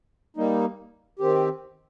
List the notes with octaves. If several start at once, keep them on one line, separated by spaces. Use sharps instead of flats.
G3 A#3 D#4
D#3 C4 G4